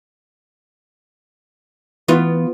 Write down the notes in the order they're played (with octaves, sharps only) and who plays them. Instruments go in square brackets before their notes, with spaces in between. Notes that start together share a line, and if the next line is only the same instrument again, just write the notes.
[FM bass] E3 [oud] B3 F4